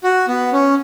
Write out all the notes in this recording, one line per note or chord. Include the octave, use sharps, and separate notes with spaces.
F#4
B3
C#4